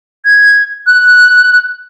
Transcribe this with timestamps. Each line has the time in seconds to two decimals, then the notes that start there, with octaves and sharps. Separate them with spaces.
0.25 G#6
0.86 F#6